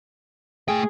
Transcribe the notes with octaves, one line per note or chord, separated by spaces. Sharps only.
A3 G#4 G5